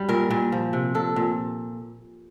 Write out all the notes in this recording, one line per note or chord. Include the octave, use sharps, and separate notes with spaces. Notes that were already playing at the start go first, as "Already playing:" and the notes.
Already playing: G2 F#3 G3
A#2 A#4
A#2
F3
C3
A#2 A4
A#2